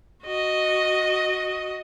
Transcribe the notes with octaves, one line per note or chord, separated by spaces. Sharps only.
F#4 D#5